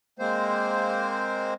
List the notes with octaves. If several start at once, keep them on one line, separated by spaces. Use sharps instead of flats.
G#3 A#3 C4 C5